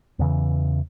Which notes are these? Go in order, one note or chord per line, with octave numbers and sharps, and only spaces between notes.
E2 C#3 E3